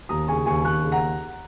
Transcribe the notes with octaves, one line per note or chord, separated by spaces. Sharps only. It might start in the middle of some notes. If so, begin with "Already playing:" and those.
D#2 A#5 D#6
C#3 G#5 C#6
D#2 G#5 C#6
D#2 C#6 F#6
C#3
F#5 A#5